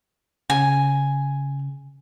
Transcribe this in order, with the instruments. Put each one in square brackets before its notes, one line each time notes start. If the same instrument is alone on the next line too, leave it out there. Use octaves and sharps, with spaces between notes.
[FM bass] C#3 [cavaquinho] G#5